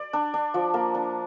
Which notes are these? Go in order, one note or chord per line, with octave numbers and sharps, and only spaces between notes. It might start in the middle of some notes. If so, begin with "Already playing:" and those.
Already playing: D5
D4
D4
F3
A#3
D4